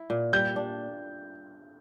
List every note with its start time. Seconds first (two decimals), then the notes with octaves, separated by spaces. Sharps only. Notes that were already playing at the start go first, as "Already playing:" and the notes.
Already playing: E4
0.10 A#2
0.33 G3 G6
0.56 D4